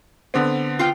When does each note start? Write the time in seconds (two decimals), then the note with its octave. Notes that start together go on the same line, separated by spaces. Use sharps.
0.34 D3 B3 C4
0.79 F4 F5 G5